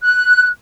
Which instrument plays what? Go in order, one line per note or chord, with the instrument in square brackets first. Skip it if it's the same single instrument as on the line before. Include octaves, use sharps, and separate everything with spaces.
[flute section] F#6